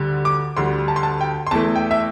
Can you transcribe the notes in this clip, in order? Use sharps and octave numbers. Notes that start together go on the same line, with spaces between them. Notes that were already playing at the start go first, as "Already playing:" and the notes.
Already playing: D2 D3 G3
D6
D2 D3 G3 C6
A5
C6
A5
G5
C6
E2 E3 A3 A5
G5
E5